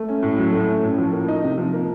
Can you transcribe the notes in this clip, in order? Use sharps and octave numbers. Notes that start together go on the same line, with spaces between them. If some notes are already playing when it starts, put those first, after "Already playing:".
Already playing: A3
C#4
A2
F#3
A3
C#4
A2
F3
A#3
D#4
C3
F3
A#3